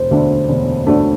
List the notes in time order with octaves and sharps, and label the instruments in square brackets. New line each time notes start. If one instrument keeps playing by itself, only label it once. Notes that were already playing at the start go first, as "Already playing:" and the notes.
Already playing: [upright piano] E1 [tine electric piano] C5
[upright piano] D2 D3 A3 D4
E1
D2 D3 A3 D4